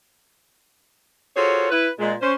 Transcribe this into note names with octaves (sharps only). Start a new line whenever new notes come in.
F4 F#4 G#4 A4 C5 C#5
E4 B4
A#2 G#3
C#4 C5